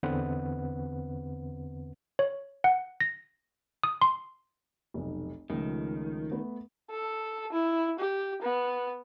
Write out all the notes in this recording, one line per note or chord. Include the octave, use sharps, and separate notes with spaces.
E2 D3 B3 C4 B4 F#5
C#5
F#5
A#6
D#6
C6
F1 B1
C#2 D#3 F3 A3
A3 B3 B4
A4
E4
G4
B3